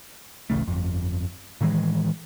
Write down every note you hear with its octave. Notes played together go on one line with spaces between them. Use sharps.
D1 A1 C#3 A3
G1 F2
A2 D#3 E3 G#3